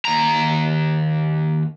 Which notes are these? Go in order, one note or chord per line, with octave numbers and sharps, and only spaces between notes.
D#2 A#5